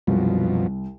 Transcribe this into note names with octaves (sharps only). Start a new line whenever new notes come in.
C2 F#2 B2 F3